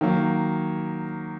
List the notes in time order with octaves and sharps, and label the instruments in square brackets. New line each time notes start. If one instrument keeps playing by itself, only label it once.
[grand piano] D#3 F#3 A#3